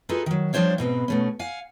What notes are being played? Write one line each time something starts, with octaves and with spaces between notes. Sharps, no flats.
D#4 F4 F#4 G#4 A4 B4
D#3 F#3
F3 G3 D4 C5 C#5 F5
G#2 B2 C4 B4
B2 A3 C#4
F5 F#5 G#5